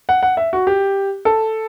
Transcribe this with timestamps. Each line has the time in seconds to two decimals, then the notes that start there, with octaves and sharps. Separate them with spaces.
0.09 F#5
0.23 F#5
0.37 E5
0.53 F#4
0.67 G4
1.25 A4